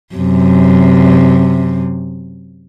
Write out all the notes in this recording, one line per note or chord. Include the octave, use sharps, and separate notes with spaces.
F#2 C3